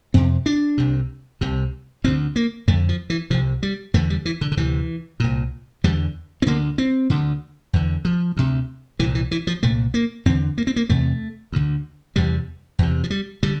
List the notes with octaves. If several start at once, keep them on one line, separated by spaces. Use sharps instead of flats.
F2 C3 C4
D4
C2 C3
C2 C3
D2 D3 C4
A#3
F2 D3 A3
F3
E3
C2 C3 F3
G3
E2 D3 A3
G3
E3
D3
D3
D2 C3 E3
C2 A#2
E2 D3 G3
C4
D2 D3 A#3
C4
D2 D3
E2 D3
F3
D2 C3
C2 A#2 E3
E3
E3
F3
C2 A#2 A3
A#3
E2 D3 C4
A#3
C4
A#3
E2 C3 A3
D2 D3
E2 C3 G3
E2 C3
F3
G3
D3 G3